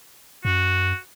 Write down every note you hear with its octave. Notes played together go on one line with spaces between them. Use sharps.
F#2 F#4